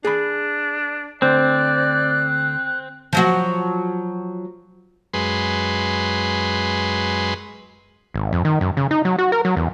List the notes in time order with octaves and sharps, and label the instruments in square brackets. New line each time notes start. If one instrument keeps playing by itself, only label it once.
[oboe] D4 [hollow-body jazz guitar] G#4 B5
[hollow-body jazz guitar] D2 D3 C5 [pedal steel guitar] C4 [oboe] D5 [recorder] F#6
[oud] F3 F#3 F#4
[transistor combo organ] F#2 G#3 B4 C6
[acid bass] G#1
F2
D#3
F#2
C#3
D#4
F#3
F#4
A#4
F#3
E2